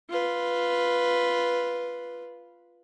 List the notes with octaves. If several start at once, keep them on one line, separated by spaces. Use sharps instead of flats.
F4 B4